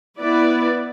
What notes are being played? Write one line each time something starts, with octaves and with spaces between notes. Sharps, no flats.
B3 E4 B4 D5